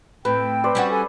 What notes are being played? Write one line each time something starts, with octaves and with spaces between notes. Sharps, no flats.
A2 C4 B4 G5
B4 C5 D5
G3 C#4 F#4
A4 G#5